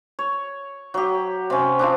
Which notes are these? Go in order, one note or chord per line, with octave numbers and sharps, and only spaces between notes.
C#5
F#3 G4
C3 C#4
F3 C4 D4